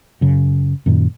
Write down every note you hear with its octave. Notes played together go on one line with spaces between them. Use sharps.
F#2 C#3
F#2 A#2 D#3